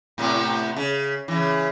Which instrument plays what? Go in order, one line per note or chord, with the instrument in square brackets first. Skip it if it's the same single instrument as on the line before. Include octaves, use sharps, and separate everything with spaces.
[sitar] A2 C3 B3
C#3
C#3 E3